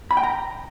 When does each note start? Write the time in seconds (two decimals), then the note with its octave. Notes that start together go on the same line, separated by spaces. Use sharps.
0.11 B5
0.17 G5
0.23 A#5